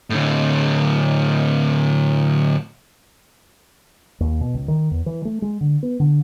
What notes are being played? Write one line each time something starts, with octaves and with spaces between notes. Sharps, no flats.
A2 D3
D#2
B2
C#2
D#3
E2
E3
A3
G#3
D3
B3
D3